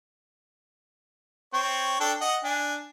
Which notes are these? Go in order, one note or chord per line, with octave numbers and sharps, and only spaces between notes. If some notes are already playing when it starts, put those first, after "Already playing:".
C4 C#5
D4 A4 G5
D#5 F#5
D4 G#5